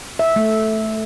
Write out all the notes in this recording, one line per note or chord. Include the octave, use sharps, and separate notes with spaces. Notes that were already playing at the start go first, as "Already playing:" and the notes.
E5
A3